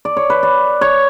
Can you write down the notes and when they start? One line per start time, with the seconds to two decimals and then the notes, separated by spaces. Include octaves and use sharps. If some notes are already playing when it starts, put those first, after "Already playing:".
0.05 D5
0.17 C#5
0.30 B4
0.43 D5
0.81 C#5